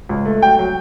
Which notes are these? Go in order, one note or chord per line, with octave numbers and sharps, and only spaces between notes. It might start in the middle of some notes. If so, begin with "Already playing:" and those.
C#2
A3
F#3 G5
F#3